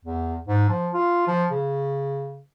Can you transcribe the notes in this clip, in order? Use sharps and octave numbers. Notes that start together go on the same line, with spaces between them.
E2
G#2
F3
F4
F3
C#3